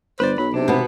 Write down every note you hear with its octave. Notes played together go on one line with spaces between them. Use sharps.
G1 B4 C5 D5
B1 F#3 B5
C3 D4
G#1 B2 B3